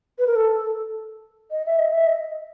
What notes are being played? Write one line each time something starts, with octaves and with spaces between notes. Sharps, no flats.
B4
A#4
A4
D#5
E5
D#5
E5
D#5